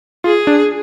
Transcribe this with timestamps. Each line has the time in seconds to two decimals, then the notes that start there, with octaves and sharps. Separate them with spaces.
0.24 F4 G#4
0.47 D4